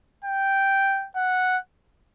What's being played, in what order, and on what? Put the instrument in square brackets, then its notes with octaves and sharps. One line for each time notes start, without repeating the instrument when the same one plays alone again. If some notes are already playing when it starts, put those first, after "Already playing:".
[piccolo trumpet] G5
F#5